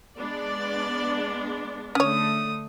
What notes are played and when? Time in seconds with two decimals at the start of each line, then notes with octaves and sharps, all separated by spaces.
0.18 G#3 B3 D4 D5
1.95 D3 A3 C#4 C#5 D#6